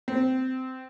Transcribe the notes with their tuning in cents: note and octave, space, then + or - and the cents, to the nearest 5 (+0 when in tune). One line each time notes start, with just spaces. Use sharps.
C4 -15